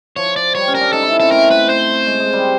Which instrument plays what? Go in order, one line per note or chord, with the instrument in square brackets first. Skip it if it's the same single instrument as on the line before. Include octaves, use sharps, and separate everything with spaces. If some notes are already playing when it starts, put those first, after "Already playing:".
[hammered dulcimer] F3 [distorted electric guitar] C#5
[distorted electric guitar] D5
[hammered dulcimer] G3 [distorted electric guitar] C#5
[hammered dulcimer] C#4
[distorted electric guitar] A#4
[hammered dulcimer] D4
[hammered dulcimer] D#4 [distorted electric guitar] A4
[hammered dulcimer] E4
C#4
[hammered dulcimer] C4 [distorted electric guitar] A4
[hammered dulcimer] A3 [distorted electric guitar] A#4
[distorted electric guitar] B4
C5
[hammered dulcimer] G#3
G#3
G3